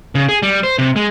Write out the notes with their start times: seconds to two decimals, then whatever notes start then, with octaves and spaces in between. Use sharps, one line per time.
0.15 C#3
0.29 G#4
0.42 G3
0.63 C5
0.78 C3
0.96 G#3